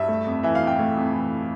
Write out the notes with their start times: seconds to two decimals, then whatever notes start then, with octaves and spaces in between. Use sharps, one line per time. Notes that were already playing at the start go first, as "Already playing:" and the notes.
Already playing: G2 E5
0.08 A3
0.27 F2
0.43 E3 E5
0.55 F5
0.61 F2
0.67 G5
0.79 A3
0.96 F2
1.14 E3